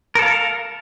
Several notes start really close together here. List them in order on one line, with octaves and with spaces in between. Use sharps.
A#4 A4 F5